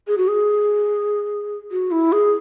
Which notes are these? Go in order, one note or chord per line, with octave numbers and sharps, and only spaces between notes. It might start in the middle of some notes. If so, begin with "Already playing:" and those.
G#4
F#4
G#4
F#4
E4
G#4